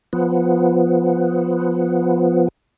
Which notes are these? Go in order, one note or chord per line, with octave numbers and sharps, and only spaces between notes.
F3 B3